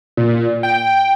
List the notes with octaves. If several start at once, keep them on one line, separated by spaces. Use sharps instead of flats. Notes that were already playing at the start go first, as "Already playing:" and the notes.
A#2
G5